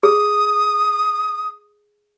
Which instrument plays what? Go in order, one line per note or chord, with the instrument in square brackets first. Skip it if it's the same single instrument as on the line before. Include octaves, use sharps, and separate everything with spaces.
[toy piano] G#4 [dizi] D#6